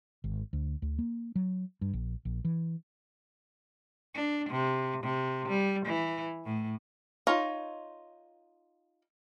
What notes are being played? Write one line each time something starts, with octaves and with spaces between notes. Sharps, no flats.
G#1
D2
D2
A#3
F#3
G2
A#1
A#1
E3
D4
C3
C3
G3
E3
A2
D#4 F4 C#5